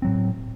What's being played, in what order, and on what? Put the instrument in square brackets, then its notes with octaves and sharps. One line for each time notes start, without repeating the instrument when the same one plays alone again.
[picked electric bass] A2 F#3 C4